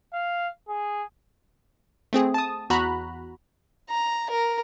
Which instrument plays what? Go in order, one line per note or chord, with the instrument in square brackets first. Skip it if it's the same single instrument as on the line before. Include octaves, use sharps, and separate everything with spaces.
[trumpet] F5
G#4
[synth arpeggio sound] A3 C4 G#4
A5 D#6
E2 F#4 A#5 B5 F#6
[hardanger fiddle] A#5
A#4